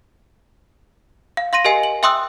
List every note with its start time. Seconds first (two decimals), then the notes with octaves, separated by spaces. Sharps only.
1.37 F5
1.53 F5 C6 A#6 D#7
1.65 G4 A#4 D#5 G#5 C7
1.83 F#7
2.03 E5 G5 C6 D#6 E6 F#6